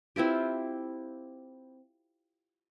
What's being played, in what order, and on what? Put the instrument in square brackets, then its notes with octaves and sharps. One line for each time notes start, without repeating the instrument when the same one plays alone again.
[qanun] C4 E4 F4 G4